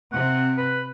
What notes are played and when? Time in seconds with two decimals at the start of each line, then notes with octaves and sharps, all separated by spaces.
0.13 C3 C4 F#5
0.57 B4